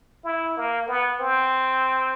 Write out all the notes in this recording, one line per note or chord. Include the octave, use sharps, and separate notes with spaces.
E4
A#3
B3
C4